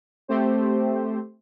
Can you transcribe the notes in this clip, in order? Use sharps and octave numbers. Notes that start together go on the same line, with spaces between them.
A3 C4 G4 C5